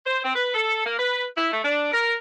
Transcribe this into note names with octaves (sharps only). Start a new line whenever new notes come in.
C5
C4
B4
A4
A#3
B4
E4
A3
D4
A#4